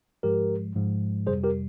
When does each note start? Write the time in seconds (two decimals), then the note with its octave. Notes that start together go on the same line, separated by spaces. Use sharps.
0.23 G#2 F3 G#3 G4 A#4
0.75 G#2 F3 G#3
1.27 F2 C3 G3 G#4 C5
1.44 G4 A#4